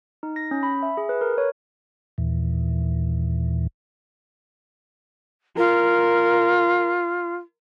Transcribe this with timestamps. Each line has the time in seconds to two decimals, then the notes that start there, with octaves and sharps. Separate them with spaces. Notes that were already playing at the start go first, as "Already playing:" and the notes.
0.23 D#4
0.36 A#6
0.51 C#4
0.63 B5
0.83 E5
0.97 G#4
1.09 B4
1.21 A#4
1.38 C#5
2.18 D#2 A#2 E3
5.57 F4 A#4